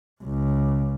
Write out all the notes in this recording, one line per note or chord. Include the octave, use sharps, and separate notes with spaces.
C#2